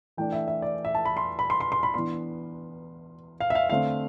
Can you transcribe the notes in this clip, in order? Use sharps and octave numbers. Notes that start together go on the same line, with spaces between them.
E3 A3 D4 G5
E5
E5
D5
E5
A5
B5
C6
B5
C6
C6
C6
B5
E3 B3 D4 C6
F5
E5
F5
D3 A3 C4 F5